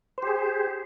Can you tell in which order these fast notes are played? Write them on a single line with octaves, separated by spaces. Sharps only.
C5 G4 G#4